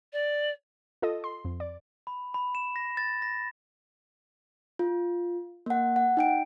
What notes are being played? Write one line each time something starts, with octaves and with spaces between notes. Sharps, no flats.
D5
F4 A4 D#5
C6
F2
D5
B5
B5
E7
A#6
A6
A#6
F4
A#3 F#5
F#5
D#4 G5 D7